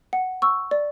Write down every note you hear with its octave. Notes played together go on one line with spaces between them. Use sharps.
F#5
C#6 E6
D5